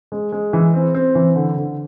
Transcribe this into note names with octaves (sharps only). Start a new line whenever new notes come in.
G#3
G#3
E3
C4
C4
E3
D3
D3